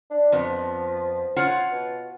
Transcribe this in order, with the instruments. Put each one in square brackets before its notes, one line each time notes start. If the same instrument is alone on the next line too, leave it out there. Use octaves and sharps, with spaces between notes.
[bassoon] D4
[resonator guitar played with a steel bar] F2 B3 [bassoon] F3
[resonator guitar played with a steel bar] F4 C#5 F#5
[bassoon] B2